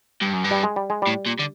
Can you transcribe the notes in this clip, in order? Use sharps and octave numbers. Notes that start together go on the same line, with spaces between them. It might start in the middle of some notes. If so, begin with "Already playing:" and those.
G2
F#2
G2
G3
G#3
G3
G#3
G3
A2
A#2
D3